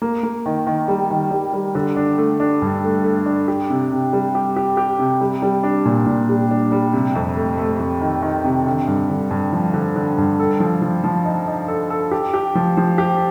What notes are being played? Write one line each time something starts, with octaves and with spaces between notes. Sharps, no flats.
A#3
A#3
D#3
D#3
G3
D#3
G3
G3
D3
D4
A3
D4
G2
A3
A3
D4
G4
C3
C3
G3
G4
G4
G4
C3
G3
G3
D4
A#2
A#2
G3
D4
G3
C3
F2
A3
A3
F2
D#3
D#3
C3
D3
G2
D3
G2
F3
D3
D3
G2
A4
F3
F3
F3
D#4
D#4
A4
A4
G4
G4
F3
F3
G4